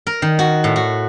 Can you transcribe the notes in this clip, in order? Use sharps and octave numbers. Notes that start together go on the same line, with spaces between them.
A#4
D#3
F#4
A2
F#4